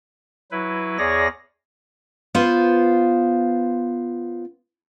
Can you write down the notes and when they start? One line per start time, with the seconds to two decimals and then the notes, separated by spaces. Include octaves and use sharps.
0.52 F#3 E4 B4
0.98 E2 G#4 C#5 D5 A#6
2.35 B3 F4 C5 F5